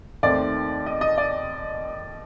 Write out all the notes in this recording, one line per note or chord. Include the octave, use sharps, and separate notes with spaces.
D#2 D#3 A3 C4 D5
D#5
D#5
D5